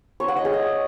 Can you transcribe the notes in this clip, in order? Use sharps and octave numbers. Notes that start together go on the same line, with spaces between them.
C#5
F#5
D#5
G#4
D#5